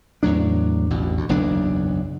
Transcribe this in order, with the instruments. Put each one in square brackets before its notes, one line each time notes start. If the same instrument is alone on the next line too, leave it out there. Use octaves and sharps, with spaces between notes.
[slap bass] E2 A2 F#3 D4
A1 E2 B2
D2
F#1 B1 E2 D4